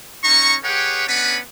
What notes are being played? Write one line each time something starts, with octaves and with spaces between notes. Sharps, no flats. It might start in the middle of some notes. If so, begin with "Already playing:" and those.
C#4 D#4 A#5 C#6
G4 G#4 B4 C#5 F#5 G5
B3 C#4 D4 B4 F#5 B5